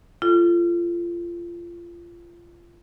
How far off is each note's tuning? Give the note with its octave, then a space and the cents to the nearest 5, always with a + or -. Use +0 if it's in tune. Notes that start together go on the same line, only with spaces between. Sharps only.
F4 -25 A4 +0